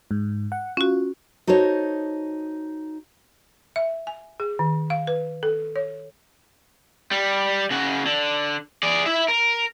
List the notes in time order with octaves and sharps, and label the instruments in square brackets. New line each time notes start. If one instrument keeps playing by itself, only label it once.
[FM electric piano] G#2
F#5
[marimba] C#4 F#4 [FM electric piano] F4
[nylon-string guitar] D#4 F#4 A4 C5 C#5
[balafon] E5
G#5
G#4
D#3
F5
B4
A4
C#5
[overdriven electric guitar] G3
C#3 F#4
D3
G#4 D5
E4 E5
A#4